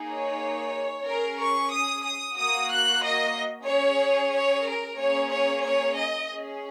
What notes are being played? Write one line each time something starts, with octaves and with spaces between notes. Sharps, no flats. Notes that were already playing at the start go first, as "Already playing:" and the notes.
Already playing: A#3 D#4 G#4
C#5
C#4 G#4 A#4
C#6
D#6
D#6
A#3 F#4 D#6
F#6
D#5
C#4 G#4 C#5
C#5
A#4
A#3 C#4 G#4 C#5
C#5
C#5
D#5
C#4 G#4